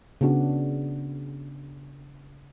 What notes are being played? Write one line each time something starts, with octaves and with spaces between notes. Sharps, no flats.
C#3 B3 D4 F#4